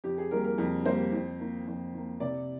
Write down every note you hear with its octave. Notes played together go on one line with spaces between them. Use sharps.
F2 G4
G#4
D#3 G3 A#3 A#4
A#4
F2
D#3 G3 A#3 C5
F2
D#3 A#3
F2
D#3 A#3
C3 D5